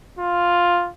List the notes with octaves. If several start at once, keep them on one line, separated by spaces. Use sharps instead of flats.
F4